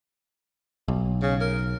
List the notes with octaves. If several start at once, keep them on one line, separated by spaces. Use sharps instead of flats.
B1
C#3
A#4